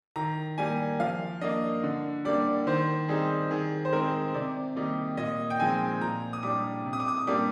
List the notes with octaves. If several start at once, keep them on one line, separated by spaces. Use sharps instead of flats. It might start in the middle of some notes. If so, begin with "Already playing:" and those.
D#3 A#5
G3 A#3 G#5
F3 F5
A#3 D4 D#5
D3
G3 A#3 D4 D5
D#3 C5
G3 C4 D#4 G#4
D#3 G#4
C5
G#3 C4 D#4 A#4
C3 D5
D#3 G3 A#3 D#4 D5
A#2 D#5
G5
F3 G#3 C4 D#4 G#5
A#2 A#5
D#6
G3 D4 D6
C3
D#6
D6
D#6
G3 A#3 D4 D6